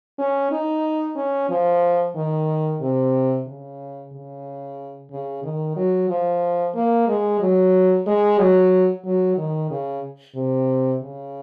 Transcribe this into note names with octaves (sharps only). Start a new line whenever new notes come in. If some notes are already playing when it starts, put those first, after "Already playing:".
C#4
D#4
C#4
F3
D#3
C3
C#3
C#3
C#3
D#3
F#3
F3
A#3
G#3
F#3
G#3
F#3
F#3
D#3
C#3
C3
C#3